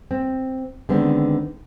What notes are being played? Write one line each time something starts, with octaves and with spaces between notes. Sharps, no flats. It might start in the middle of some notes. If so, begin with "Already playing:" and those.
C4
D3 D#3 G#3 B3 C4